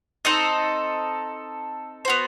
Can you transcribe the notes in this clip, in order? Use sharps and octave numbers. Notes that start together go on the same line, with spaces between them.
C4 D#4 A4 D#5
B3 F#4 C5